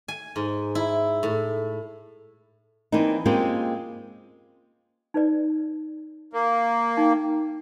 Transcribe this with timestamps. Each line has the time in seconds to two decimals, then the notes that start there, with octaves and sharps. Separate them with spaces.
0.08 G#5
0.36 G#2
0.75 E4
1.23 A2
2.92 E3 A#3 C4 D4 D#4
3.25 G#3 A#3 C4 C#4 F4 G4
5.14 D#4 B4 D5
6.33 A#3
6.97 D#4 G5